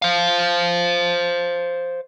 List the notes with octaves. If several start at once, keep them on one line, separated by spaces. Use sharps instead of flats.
C5 F5